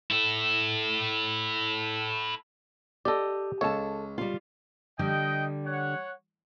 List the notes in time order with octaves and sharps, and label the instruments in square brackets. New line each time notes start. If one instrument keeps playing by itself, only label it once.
[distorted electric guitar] E4 A4
[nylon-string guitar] G4 D#5 [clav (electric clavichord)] A4 D5
[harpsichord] C#2 [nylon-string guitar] A4 A5 [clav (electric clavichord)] C#5
[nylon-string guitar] G3 F4
[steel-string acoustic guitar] D3 G3 [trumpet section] D#5 G5
[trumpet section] C#5 F#5